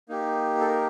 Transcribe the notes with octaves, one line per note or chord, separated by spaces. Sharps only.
A#3 D#4 G4
A4
A#4